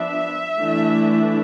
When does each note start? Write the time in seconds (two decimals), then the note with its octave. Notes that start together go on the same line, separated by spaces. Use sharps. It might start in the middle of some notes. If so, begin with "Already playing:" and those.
Already playing: F3 B3 D4 E5
0.58 E3 A3 D4